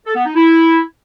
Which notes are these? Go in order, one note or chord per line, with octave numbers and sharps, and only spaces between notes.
A4
B3
D#4
E4